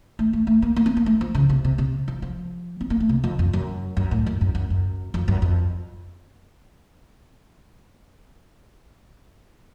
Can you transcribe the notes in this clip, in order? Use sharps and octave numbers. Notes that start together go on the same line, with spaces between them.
A3
A3
A3
A#3
A#3
C4
A#3
A3
F3
C#3
C3
C3
C3
F3
F3
C4
A#3
A3
C3
F2
F2
F#2
F#2
A2
F#2
F#2
F#2
F#2
F2
F#2
F2